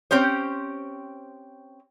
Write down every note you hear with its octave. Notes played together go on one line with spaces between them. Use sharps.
C4 C#4 G4 C5